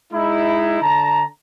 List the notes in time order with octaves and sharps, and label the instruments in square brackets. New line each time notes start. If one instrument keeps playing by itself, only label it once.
[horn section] G#3 D#4 E4
D3 A5 A#5